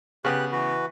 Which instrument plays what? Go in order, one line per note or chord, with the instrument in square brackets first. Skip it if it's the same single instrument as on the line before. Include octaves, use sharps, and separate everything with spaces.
[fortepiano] C#3 B3 [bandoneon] G4 B4 F#6
[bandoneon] E3 F#4 B4